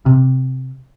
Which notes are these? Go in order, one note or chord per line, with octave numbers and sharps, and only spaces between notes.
C3